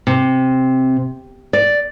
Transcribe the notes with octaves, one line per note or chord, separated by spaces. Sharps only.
C3
D5